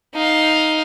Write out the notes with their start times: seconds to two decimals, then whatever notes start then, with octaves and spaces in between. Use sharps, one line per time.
0.14 D#4 F5